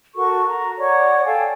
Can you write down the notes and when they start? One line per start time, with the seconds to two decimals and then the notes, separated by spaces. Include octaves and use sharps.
0.15 F#4 A4 A#4 C#6
0.46 A#5
0.79 C#5 D5 F#5 C#6
1.25 A4 F5 G5 G#5